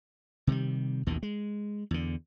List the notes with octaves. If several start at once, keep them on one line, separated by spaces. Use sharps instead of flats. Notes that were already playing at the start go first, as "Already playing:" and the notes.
C3 D#3 F#3 G3
A1 D#2 B2 D#3
G#3
E2 D3